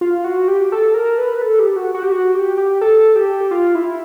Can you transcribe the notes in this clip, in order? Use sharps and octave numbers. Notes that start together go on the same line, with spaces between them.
F4
F#4
G4
A4
A#4
B4
A4
G4
F#4
F#4
G4
F#4
G4
G4
A4
G4
F4
E4